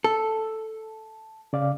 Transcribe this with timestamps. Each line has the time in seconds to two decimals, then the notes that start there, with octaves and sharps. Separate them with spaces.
0.04 A4
1.53 C#3 D5 F5